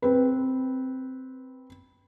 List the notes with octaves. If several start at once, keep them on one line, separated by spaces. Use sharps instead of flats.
C4 B4